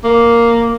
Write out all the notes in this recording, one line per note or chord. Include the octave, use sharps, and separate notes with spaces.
A#3